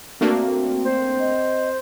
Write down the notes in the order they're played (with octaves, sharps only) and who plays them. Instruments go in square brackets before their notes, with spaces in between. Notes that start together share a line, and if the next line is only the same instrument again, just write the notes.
[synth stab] A3 A#3 D4 [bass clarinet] C4 [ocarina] F#4
[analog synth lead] C5
[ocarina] D#5